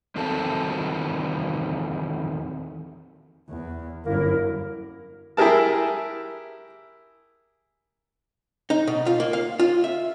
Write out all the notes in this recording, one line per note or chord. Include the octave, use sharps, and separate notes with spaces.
E2 D#3 C4 F#4 A4 A5
E2
G1 F#2 A#3 E4 A#4
E4 G4 G#4 A#4 A5
D#4
B2
F4
A#3
F5
F4
E5